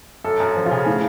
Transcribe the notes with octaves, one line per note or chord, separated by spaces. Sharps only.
F#2 A4
F#2
F3
F4
C#3
A2